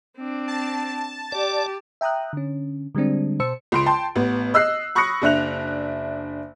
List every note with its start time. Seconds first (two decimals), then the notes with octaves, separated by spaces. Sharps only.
0.17 C4 D4
0.48 A5
1.32 G4 D5
2.01 E5 G5 A#5 D#6 F#6
2.33 D3 C#4
2.95 D3 G3 G#3 C4 D4
3.40 B2 C5 A5 E6 C#7
3.72 C#2 C6 D7
3.86 G5 A5 C6
4.16 A1 B3
4.54 D#5 E6 F#6 C7
4.95 B5 C#6 D#6 F#6 A#6 C#7
5.22 F#1 D4 E5 F#6 F7